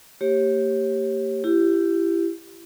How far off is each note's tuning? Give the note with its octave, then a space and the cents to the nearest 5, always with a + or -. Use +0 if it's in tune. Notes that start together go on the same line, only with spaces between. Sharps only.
A#3 -40 G4 +0 C#5 -30
E4 +25 G4 +0